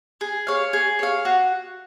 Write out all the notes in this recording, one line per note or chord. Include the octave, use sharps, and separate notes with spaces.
G#4
C#5 F5
G#4
C#5 F5
F#4